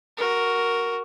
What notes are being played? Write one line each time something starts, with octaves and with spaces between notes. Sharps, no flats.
F#4 A#4